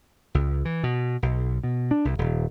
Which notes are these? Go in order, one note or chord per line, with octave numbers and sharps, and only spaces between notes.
C#2
E3
B2
B1
B2
D4
C2
D#1